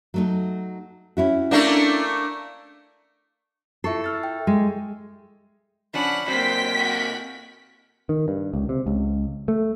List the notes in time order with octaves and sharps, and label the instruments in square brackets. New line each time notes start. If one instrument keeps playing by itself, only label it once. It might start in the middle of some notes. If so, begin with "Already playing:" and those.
[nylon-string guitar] F#3 A3 D#4
C#4 E4 F#4
[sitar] A3 A#3 D4
[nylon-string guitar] E4 A4 [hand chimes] F4 C#6 C7
[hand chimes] E6 F6 A6
G5
[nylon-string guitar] G#3
[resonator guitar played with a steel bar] F3 C#4 D4 [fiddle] F#5 B5
[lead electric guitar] C3 A#3 [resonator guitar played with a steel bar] F#3 [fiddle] C5 [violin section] G5 B6
[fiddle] F#4
[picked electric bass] D#3
G2
C#2
C3
C#2
A3